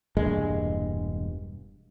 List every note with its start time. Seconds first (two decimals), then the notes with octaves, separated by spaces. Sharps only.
0.17 E1 G2 A#2 G#3